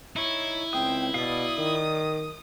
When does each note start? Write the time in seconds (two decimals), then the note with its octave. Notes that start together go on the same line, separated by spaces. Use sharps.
0.16 D#4 E4 C#5
0.73 C#2 C4 G5 D#6
1.14 B2 D5 F5 D#6
1.58 D#3